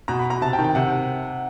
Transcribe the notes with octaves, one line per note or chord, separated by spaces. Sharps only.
B2 A#5
B5
A#5
C3 A5
G5
D#3
G5
C3 F#5